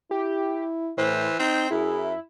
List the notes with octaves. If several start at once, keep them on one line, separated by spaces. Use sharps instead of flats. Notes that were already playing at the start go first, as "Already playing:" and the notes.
E4 G4
A2 E3 C5
C4 D#4 G6
F#2 E4 G#4